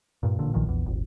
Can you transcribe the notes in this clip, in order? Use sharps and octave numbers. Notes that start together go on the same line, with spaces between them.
G2 A#2
A1 A#2 D3
B1 A#2 D#3 F3
A#1 E2
D#1 G#1